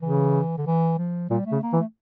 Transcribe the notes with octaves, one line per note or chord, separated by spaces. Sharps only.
C#3 E3
D3
E3
F3
A#2 G3
A3
C#3
A#3
E3
A3